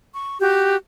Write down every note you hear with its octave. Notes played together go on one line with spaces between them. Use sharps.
C#6
F#4 G4 G6